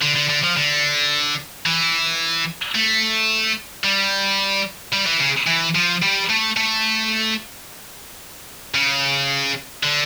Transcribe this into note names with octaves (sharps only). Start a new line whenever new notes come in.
D3
D3
D3
F3
D3
E3
A3
G3
G3
E3
C#3
E3
F3
G3
A3
A3
C#3
D3